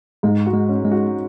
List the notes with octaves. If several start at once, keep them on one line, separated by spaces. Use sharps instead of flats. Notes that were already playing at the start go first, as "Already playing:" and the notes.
G#2 G#3
F#4
G#3
C#4
G#3
F#4